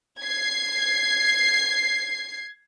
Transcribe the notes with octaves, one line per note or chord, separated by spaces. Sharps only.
G#6 C7